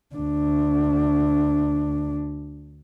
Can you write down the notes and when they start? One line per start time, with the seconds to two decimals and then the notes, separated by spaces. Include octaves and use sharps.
0.15 D2 D4